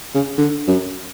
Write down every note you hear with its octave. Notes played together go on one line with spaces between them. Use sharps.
C#3
D3
F#2